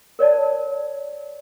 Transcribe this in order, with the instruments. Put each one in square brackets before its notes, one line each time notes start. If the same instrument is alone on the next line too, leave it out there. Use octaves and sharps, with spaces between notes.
[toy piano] A#4 C#5 D5 A5